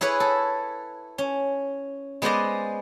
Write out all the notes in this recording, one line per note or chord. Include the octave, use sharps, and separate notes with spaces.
E4 G#4 B4 C#5
A4
C#4
G#3 B3 G#4 C5 D5 D#5